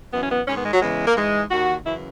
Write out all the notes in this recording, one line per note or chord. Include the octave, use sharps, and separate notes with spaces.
F#2 E3 B3
C#4
B3
G#2 D#3 C#4
B3
G#3
F#3
E2 C#3 E3 G#3
A#3
G#2 E3 G#3
D#2 D#3 F#4
F#2 C#3 E3 E4